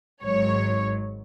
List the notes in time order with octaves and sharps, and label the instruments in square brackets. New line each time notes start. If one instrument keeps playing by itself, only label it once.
[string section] G#1 G#2 F#3 C#5